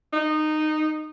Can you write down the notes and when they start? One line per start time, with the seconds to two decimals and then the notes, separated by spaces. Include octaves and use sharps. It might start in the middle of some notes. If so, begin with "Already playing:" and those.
0.13 D#4